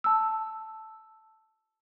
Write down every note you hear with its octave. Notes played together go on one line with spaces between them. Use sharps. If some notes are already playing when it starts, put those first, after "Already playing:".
A5 E6